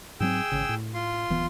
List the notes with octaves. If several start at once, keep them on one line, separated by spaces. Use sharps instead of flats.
G#2 F#3 C4 G#4 G5 E6
G#1 C#3
A2
F4 C6
D1 E3 B3